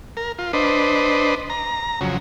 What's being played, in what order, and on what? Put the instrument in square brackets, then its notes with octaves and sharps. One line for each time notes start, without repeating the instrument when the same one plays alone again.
[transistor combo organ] A#4
F4
D4 B4 C5 D#5
A#5
F2 C#3 F#3